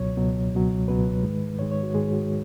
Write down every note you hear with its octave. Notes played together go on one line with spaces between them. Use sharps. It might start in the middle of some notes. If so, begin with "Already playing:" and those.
Already playing: C#2 B2 F#3 C#5
C#2 B2 F#3
C#2 B2 F#3
C#2 B2 F#3 B4
G#2 D#3 G#3
G#2 D#3 G#3 C#5
C#5
F#4
G#2 D#3 G#3 G#4
F#4